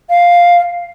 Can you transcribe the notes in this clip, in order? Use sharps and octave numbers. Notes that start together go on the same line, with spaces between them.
F5